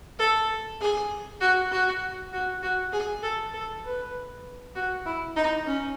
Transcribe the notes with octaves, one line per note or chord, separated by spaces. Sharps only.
A4
G#4
F#4
F#4
F#4
F#4
G#4
A4
A4
B4
F#4
E4
D#4
C#4